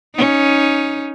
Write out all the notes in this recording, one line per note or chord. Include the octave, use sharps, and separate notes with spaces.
C#4 D#4